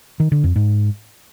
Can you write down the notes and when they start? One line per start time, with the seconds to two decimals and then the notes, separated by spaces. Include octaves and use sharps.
0.20 D#3
0.32 D3
0.44 F2
0.56 G#2